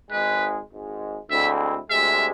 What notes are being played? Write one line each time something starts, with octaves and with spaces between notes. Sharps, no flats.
G#1 G#2 G#3 B4
G#1 G#2 G#3
D2 D3 G#3 C4 E4 E5
D2 C3 G#3 E5